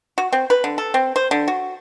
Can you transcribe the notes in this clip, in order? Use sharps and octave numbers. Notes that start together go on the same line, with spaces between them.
F#4
C4
B4
D3
A4
C4
C5
D3
F#4